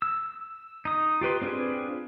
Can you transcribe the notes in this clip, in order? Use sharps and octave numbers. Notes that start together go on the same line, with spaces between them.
E6
D#4 D#6
F4 G4 B4 C6
C4 D4 F4 G#4 B4